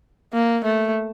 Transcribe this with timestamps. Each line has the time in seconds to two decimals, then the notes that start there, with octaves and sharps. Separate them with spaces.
0.34 A#3
0.64 A3